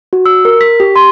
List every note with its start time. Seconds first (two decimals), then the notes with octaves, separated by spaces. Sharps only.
0.13 F#4
0.26 E6
0.45 A#4
0.61 B6
0.80 G4
0.96 C6